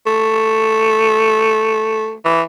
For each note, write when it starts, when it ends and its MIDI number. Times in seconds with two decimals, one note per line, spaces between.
0.07 2.14 57
2.25 2.42 52